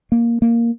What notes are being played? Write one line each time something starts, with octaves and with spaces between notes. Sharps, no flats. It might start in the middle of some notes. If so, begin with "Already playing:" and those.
A#3
A#3